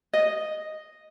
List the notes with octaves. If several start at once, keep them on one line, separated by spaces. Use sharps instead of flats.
D#5